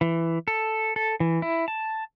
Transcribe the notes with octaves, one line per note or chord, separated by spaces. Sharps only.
E3
A4
A4
E3
E4
A5